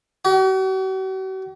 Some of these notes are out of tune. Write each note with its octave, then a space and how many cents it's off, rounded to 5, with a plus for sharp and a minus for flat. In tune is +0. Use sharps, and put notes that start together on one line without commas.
F#4 +45